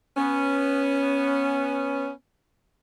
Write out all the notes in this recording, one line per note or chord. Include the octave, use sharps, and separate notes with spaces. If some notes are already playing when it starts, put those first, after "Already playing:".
B3 C#4